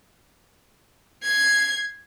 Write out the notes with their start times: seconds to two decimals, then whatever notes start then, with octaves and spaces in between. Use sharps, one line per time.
1.23 G#6 C7